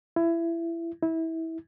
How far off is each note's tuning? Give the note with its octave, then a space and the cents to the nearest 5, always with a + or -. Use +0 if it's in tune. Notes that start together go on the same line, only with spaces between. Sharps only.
E4 +25
E4 -20